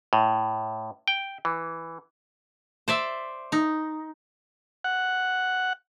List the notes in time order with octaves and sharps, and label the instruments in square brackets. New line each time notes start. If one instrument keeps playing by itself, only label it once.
[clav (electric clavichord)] A2
G5
E3
[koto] C5 D5 E5
D#4
[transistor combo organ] F#5